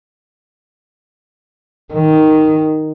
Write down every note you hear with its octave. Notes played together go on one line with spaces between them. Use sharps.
D#3